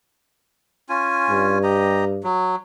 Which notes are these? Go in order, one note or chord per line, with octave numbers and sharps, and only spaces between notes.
C#4 F4 G#5
G2
G4 D#5 A#5
F#3